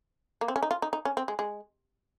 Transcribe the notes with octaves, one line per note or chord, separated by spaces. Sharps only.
A#3
C4
C#4
D#4
F4
D#4
D#4
C#4
C4
G#3
G#3